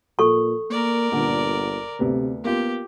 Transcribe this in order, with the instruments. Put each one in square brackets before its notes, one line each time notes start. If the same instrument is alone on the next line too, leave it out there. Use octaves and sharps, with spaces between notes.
[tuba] A#2 [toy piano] A4 C#6
[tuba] A#3 [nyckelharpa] A#4 D5
[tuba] G1 [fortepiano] A#2 D3
[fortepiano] D2 B3 [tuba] C3
[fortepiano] A#3 F4 [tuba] B3 [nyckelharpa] G4